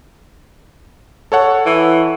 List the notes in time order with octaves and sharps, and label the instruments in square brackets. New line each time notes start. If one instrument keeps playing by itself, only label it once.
[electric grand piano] A4 C#5 F#5
[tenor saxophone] E3